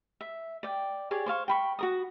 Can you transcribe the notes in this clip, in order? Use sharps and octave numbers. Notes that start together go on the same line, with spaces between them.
E5
D5 G5
G4 G#4 C#5 D5
C5 D5 F5 C#6
G5 B5 C#6
F#4 A#4 D#6